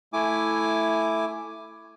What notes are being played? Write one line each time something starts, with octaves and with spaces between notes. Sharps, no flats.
A3 E4 G#5 D6